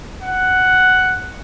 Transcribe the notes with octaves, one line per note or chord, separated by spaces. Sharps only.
F#5